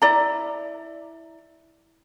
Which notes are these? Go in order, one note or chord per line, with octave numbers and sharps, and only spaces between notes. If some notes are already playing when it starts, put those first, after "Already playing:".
E4 D5 A#5